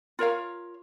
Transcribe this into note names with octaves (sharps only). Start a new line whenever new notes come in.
F4 A#4 C#5 F5